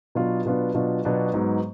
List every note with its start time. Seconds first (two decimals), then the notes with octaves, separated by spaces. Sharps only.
0.15 B2 F#3 B3 D4 F4
0.46 B2 F#3 B3 D4 F4
0.75 B2 F#3 B3 D4 F4
1.04 B2 F#3 B3 D4 F4
1.34 G#2 F#3 B3 D#4